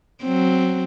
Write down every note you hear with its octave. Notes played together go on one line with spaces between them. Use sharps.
F#3 C4